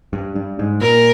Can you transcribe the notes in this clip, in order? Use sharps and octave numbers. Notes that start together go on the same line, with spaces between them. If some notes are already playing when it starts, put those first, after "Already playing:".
G2
G2
G#2
A#2 A#4